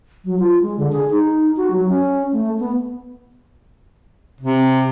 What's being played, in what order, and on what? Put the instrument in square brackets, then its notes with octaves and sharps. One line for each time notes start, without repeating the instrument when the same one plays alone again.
[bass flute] F#3
F4
G#3
D3
G#4
D#4
F#4
F#3
C#4
A3
B3
[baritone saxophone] C3